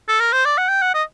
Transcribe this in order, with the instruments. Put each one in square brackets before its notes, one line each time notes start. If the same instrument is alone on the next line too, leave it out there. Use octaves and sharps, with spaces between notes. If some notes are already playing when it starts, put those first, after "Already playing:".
[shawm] A4
A#4
C5
D5
F#5
G5
F#5
D#5